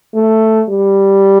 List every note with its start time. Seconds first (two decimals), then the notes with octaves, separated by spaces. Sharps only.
0.15 A3
0.69 G3